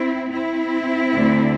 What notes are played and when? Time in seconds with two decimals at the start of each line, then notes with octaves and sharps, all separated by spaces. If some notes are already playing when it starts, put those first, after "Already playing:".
Already playing: C4 E4
0.31 C4 E4
1.14 D2 D3